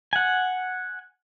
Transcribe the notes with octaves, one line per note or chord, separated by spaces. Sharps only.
F#5 G#5